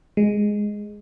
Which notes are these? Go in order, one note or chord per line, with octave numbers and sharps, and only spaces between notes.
G#3